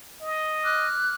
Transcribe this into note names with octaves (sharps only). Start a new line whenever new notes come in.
D#5
D6 F6 F#6